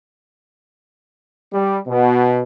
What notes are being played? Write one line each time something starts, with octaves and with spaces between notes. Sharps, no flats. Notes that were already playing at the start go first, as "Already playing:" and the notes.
G3
B2